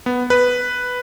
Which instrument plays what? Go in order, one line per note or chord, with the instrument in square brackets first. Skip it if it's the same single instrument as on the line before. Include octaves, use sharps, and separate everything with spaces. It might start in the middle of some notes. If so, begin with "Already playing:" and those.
[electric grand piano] B3
B4